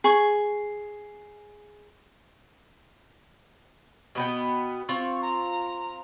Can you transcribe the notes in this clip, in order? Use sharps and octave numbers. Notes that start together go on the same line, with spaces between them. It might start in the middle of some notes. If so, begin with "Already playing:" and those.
G#4 C#6
B2 B3 G5
C4 F4 C#6
A#5